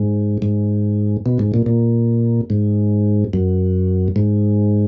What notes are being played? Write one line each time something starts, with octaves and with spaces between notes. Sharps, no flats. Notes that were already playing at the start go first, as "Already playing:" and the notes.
Already playing: G#2
G#2
B2
G#2
A#2
A#2
G#2
F#2
G#2